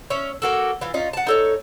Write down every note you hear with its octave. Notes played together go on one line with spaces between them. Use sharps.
C#4 E5
A#3 F#4 A4
E3 F4
C#4 D#4 F4
F#5 A5
D#4 A4 C#5